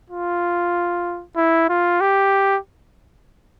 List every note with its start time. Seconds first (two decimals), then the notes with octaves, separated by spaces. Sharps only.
0.10 F4
1.37 E4
1.69 F4
2.01 G4